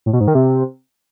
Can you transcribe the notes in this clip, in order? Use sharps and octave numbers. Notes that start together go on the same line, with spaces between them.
A2
B2
G#2
D#3
C3